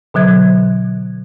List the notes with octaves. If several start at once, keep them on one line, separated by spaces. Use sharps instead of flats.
B2 D3 F#3 G#6